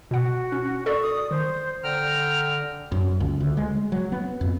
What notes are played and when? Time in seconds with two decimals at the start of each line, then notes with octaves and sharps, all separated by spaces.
0.11 B2 F#4 F#5
0.52 C#4
0.86 A4 D5 C#6
1.03 D#6
1.31 D#3 C5
1.83 D3 G5 A#5 F6
2.92 F#2
3.20 C#2
3.40 D2
3.57 G#3
3.92 F#3
4.12 B3
4.41 F2